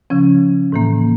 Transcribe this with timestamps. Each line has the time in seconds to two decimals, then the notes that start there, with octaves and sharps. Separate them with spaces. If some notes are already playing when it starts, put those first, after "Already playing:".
0.10 C#3 F3 C#4
0.72 A2 E3 A#3